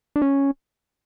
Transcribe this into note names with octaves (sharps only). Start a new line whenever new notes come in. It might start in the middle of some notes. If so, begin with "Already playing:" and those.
D4
C#4